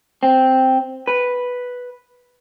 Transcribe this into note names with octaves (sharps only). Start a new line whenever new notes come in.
C4
B4